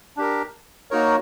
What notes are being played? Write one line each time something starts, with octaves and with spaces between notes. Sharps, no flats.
D4 G4 A#4
A#3 D#4 F#4 A#4 C#5